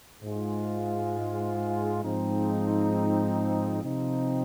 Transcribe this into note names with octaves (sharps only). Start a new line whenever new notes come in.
G#2 G#3 F4
G#2 F3 C4 D#4
C3 F3 C4 D#4